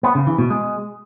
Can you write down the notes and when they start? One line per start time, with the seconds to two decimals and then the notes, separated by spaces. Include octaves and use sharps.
0.03 B3
0.15 C#3
0.27 E3
0.39 B2
0.50 G#3